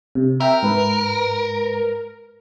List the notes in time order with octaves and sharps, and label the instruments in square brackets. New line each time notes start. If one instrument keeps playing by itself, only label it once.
[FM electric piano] C3
[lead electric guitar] A#4 [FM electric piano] E5 G5
[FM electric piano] G#2 B4